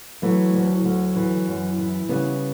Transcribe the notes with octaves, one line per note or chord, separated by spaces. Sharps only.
E3 F#3 A3
D2
D2
E3
F#2
E3
C#3 G3 B3